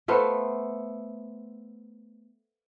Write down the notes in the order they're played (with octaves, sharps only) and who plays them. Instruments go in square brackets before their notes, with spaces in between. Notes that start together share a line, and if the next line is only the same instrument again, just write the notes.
[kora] A3 B3 C5 F5